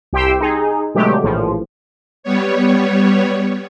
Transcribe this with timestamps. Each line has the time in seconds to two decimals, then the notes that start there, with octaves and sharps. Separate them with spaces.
0.13 C2 G4 G5 C6 E6
0.40 D#4 G#4
0.95 B2 D3 F#3 G#3 A3 G4
1.23 A#1 A2 E3 F3
2.23 G3 B3 C#5